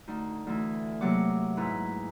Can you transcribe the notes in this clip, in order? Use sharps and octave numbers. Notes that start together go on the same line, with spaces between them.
D2 D#4
D2 E3
C3 F#3 A3 A#3 F#5 D6
G#2 E4 B4 A#5